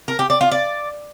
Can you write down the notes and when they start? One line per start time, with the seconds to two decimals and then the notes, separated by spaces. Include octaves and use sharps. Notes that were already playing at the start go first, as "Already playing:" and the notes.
0.08 A#4
0.19 G4
0.30 D5
0.41 F4
0.52 D5